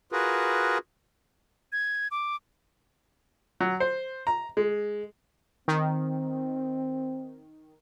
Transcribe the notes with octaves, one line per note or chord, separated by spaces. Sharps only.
F4 F#4 G#4 A#4 B4
G#6
D6
F#3
C5
A#5
G#3
D#3 C4